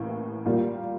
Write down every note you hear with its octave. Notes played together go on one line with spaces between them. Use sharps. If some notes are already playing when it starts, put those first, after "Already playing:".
Already playing: A1 A2 A#3
A#2 G3 A#3 F4